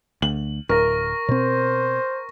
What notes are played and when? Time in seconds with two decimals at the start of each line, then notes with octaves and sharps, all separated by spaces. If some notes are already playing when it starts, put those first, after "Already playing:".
0.22 D2 F#7
0.69 D1 A#4 C#6 A#6
1.29 B2 C4 C5